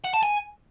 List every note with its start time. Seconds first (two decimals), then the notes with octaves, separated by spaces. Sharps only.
0.04 F#5
0.14 A5
0.23 G#5